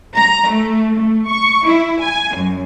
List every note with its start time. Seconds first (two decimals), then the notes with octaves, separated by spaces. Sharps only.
0.16 A#5
0.50 A3
0.96 A3
1.28 C#6
1.66 E4
2.01 G#5
2.34 F#2